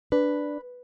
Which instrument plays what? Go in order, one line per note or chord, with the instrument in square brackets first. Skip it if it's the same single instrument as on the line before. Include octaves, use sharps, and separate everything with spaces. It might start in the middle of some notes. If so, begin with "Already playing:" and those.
[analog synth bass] D4 [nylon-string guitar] B4